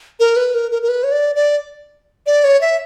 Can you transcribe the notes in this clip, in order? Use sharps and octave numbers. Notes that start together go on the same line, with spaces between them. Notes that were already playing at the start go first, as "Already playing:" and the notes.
A#4
B4
A#4
A#4
A#4
B4
C#5
D5
D5
D5
C#5
E5